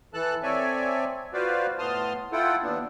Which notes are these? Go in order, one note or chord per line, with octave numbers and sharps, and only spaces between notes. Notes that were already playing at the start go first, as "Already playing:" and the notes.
E3 A4 A5 F#6
C4 A4 C#5 D5 E5 G#5
F4 F#4 B4 C5 D5 F5
A2 B3 A5 C6 D#6 F6
E4 F4 A4 F#5 G5
D#2 B3 D4